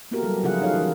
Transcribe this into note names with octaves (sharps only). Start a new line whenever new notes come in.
A#3 B3 E4 F#4 G4 A#4
F#3 G3 A4
C#3 F3 E4 F4 G#4 F#5
D#4 F#4 G#4 A4 C#5 F5
E3 A#4